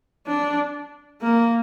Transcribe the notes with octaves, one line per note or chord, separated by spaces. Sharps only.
D4
A#3